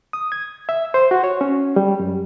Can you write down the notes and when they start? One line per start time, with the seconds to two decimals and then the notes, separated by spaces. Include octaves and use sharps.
0.13 D#6
0.32 G#6
0.69 E5
0.94 C5
1.11 F#4
1.24 C#5
1.41 C#4
1.76 G3
2.00 F#2